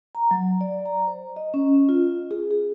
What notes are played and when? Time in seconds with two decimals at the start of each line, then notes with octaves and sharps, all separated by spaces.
0.15 A#5
0.31 F#3
0.61 D5
0.86 A#5
1.07 C5
1.36 D#5
1.54 C#4
1.89 F4
2.31 G#4
2.51 G#4